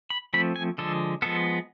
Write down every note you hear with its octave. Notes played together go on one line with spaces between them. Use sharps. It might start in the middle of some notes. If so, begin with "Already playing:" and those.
B5
F3 A3 C4 B5
G#5
D3 F3 G#3 A4
F3 G#3 B3 A4